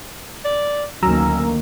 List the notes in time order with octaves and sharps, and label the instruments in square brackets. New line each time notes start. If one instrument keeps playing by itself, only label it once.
[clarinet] D5
[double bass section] D2 D#3 A#3 [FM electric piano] F#3 A#5 E6 [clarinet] C#4